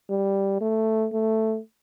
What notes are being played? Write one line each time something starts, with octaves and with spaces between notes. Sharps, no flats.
G3
A3
A3